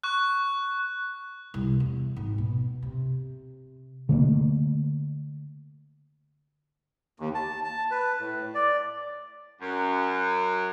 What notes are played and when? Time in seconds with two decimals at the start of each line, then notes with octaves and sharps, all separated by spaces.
0.03 C#6 F#6
1.54 C2
1.80 E2
2.16 G#1
2.38 B2
2.83 C3
4.09 D3 A3 A#3
7.20 D#2
7.35 A5
7.64 A5
7.91 B4
8.20 A2
8.54 D5
9.61 F#2